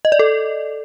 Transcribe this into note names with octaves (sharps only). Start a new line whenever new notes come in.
D#5
D5
A4